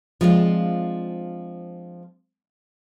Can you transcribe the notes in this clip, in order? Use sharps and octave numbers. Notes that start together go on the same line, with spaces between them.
F3 G#3 C4 D4 F4